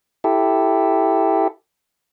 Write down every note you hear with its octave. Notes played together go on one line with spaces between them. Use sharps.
E4 G4 A4